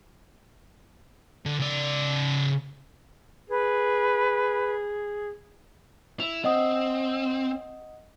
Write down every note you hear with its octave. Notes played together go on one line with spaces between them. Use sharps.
D3
C#3 D5
G#4 B4
E4 F7
C4 D#5 F#5 D#6